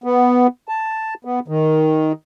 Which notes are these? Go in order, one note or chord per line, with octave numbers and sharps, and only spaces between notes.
B3
A5
B3
D#3